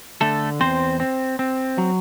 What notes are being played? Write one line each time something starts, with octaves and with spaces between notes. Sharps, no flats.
D3 A3 A4
E2 C4 C5
C4
C4
F#3